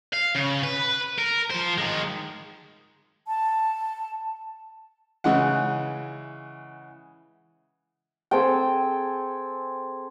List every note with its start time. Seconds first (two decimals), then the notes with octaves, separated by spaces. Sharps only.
0.13 F5
0.35 C#3
0.63 B4
1.18 A#4
1.51 F3 C5
1.78 D#3 G#3
3.28 A5
5.24 C#3 E3 G#3 F#5
8.31 C4 G#4 A4 G5